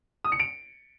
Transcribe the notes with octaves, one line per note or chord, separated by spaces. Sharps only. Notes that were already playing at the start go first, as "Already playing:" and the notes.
D#6
C#7
D7